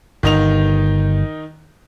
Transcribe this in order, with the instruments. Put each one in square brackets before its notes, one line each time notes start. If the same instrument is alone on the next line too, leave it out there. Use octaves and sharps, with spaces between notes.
[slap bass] G1 [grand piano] D#3 D#4 F7